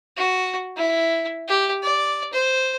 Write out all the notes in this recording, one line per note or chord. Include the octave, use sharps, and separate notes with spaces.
F#4
E4
G4
D5
C5